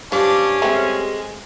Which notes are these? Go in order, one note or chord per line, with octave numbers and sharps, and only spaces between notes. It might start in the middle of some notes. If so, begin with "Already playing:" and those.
G2 F3 C#4 D4
G#3 A3 C4